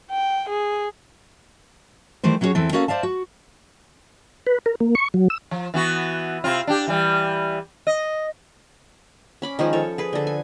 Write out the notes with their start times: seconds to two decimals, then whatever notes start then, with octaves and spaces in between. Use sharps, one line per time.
0.11 G5
0.49 G#4
2.24 D#3 E3 G3 A3 C5
2.41 F#3 C#4 E4 F#4 G#4 C#5
2.55 E2 E3 C4 E4 A4
2.72 A#3 C#4 F#4 A4 C#5 F5
2.88 C5 D5 E5 F5 A5
3.03 F#4
4.47 B4
4.66 A#4
4.80 A#3
4.95 C#6
5.14 F#3
5.30 E6
5.51 F3
5.74 E3 B3 F#4
6.44 C3 C4 F4
6.67 D4 G4
6.88 E3 G3
7.87 D#5
9.42 C#4 B5 D6
9.59 D#3 F3 G#3 G#4
9.73 F3 A4 C#5
9.98 G#4 B4
10.13 D3 A4
10.27 G#5